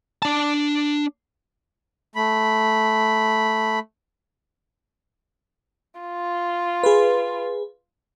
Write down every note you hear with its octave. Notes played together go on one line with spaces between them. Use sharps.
D4 A5
A3 B5
F4
G#4 B4